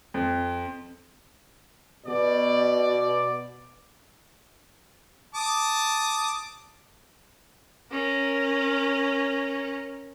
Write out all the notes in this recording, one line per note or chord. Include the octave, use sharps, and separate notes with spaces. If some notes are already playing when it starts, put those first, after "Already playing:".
F2
B2 D5
A5 D6 D#6
C#4 A#4